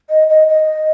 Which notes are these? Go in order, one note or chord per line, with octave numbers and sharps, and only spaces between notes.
D#5
D#5
D#5